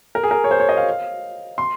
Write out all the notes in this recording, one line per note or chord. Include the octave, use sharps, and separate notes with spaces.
A#4
G#4
A#4
C#5
C5
C#5
D#5
F5
C6